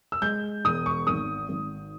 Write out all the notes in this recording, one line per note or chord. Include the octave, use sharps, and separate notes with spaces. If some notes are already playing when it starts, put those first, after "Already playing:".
E6
G#3 G6
E1 D#6
C#6
G#1 D#6
G#1